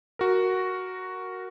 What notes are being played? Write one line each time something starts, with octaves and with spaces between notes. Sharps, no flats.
F#4 A#4